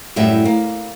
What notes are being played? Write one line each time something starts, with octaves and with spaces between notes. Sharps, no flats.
F#2 A2 G3 E5
A#3